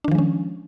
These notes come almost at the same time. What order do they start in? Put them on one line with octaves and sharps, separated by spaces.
D4 D#3 F3 G#3 C#4